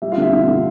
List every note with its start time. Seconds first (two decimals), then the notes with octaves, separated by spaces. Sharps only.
0.02 G3 E5
0.12 F4 F5
0.18 D3 E5
0.33 D3
0.48 D3